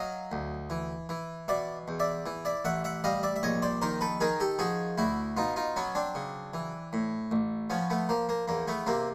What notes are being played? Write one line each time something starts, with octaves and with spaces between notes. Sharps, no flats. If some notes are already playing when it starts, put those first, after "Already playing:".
Already playing: F#3 D#5 F5
D2
E3
E3
B2 D5 E5
E2
D5 E5
E3
D5 E5
A1 E5 F#5
E5 F#5
G3 D#5 F5
D5 E5
E5
A#1 C#5 D#5
C5 D5
D#3 A#4 C5
A4 B4
D#3 G#4 A#4
G4 A4
F3 F#4 G#4
D2 E4 F#4
B2 D#4 F4
D#4 F4
F#3 B3 C#4
C4 D4
C#3
E3
A2
A1
F3 B3 C#4
A3 B3
F3 A#3
A#3
E2 A#3
A3 B3
C3 A#3 C4